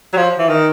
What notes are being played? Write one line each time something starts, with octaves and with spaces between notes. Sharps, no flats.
F#3
F3
E3
D#3